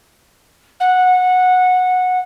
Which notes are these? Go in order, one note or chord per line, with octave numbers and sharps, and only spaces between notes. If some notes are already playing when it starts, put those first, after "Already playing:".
F#5